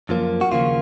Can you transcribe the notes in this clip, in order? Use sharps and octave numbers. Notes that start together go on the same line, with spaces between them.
F#2 F3 A#3
F#4
D#2 C#3 F3 A#3 F4